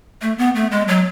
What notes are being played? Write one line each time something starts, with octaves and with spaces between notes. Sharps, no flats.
A3
B3
A3
G#3
F#3